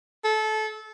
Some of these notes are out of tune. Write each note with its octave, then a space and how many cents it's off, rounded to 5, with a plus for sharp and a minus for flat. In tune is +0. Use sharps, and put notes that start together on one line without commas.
A4 -25